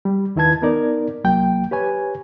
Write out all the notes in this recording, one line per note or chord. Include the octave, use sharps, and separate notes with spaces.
G3
D#2 D#3 E4 B4 A5 G#6
B3 D#4 A#4 D5
C2 F#3 A#3 G5
G4 B4 C#5 G#5